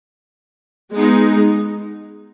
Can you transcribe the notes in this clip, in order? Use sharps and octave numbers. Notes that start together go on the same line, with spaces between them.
G#3 B3 D#4